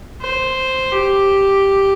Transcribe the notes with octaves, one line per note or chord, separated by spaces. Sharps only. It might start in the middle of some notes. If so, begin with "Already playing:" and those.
C5
G4